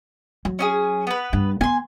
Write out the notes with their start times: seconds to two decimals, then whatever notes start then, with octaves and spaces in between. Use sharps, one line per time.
0.45 F#3
0.59 C#4 D#4 G#4
1.07 B3 B4
1.33 G2
1.61 B3 G#5 C6